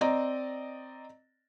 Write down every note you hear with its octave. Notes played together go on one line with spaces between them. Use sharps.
C4 D5 D#5 A#5